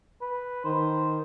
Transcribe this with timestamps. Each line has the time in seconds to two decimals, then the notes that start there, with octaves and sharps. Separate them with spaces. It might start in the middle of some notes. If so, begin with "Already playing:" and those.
0.21 B4
0.65 D#3 C5